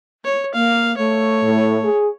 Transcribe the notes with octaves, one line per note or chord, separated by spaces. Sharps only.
C#5
A#3 F5
A3 C#5
A2
G#4